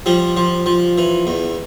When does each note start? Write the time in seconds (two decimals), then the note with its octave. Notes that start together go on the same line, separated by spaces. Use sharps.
0.06 F3 G3
0.37 F3
0.66 F3
0.98 E3
1.27 E2